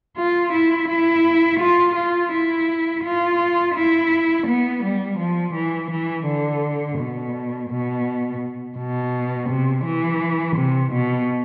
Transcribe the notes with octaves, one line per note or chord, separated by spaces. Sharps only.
F4
E4
E4
F4
F4
E4
F4
E4
B3
G3
F3
E3
E3
D3
B2
B2
B2
C3
E3
C3
B2